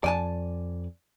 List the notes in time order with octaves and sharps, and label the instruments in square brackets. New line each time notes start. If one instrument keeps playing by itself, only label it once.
[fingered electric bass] F2 [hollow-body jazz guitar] D5 G#5 A5